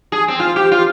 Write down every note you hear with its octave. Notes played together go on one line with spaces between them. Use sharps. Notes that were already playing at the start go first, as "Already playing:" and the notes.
G#4
C4
F4
G4
F4